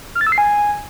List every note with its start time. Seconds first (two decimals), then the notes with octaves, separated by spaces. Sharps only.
0.15 F6
0.21 A6
0.27 E6
0.32 C7
0.38 G#5